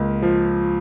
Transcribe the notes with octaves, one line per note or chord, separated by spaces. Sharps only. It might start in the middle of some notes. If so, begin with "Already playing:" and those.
Already playing: C#2 A#3
F3